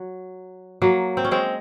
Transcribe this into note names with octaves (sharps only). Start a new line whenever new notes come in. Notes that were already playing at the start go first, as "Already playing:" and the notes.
Already playing: F#3
F#3 A#3
C4
C#4
G#3 C4